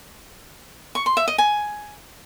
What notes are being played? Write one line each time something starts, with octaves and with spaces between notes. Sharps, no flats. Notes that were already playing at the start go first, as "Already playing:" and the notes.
C#6
C6
E5
D#5
G#5